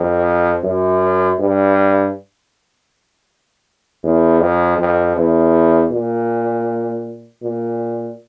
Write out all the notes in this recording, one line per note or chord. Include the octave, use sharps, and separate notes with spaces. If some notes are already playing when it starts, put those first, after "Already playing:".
Already playing: F2
F#2
G2
E2
F2
F2
E2
A#2
A#2